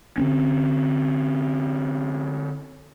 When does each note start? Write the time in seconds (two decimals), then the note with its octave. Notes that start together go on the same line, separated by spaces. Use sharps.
0.18 D3 C4 C#4